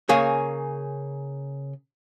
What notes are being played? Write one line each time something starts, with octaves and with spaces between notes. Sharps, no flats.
C#3 A#3 G#4 C#5